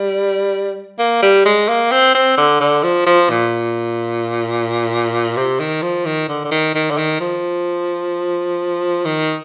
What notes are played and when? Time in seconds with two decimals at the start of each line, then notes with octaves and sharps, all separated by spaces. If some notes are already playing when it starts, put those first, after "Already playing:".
Already playing: G3
0.99 A#3
1.22 G3
1.45 G#3
1.69 A#3
1.92 C4
2.15 C4
2.37 D3
2.60 D3
2.83 F3
3.06 F3
3.30 A#2
5.37 C3
5.60 D#3
5.82 F3
6.05 D#3
6.29 D3
6.44 D3
6.51 D#3
6.75 D#3
6.90 D3
6.98 D#3
7.20 F3
9.05 D#3